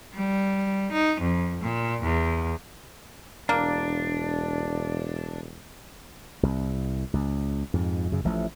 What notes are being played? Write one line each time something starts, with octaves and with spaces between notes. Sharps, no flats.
G3
D#4
F2
A#2
E2
E1 A#3 D4
C2
C#2
F2 G#2
F#2 C#3
A1 F3 A3